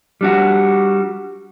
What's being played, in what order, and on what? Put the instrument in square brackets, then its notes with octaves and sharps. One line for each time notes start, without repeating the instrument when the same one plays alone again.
[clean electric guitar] G3 D4 F#4